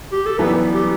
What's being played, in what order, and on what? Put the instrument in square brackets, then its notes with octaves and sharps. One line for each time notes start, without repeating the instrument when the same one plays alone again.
[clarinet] G4
A4
[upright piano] F#1 F#2 E3 G3 B3 [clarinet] B4
[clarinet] G4